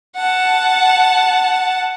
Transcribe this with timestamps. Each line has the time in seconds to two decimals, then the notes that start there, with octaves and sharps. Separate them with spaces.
0.16 F#5 A5